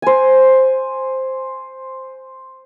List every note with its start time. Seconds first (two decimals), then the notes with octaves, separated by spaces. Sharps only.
0.02 C5 G#5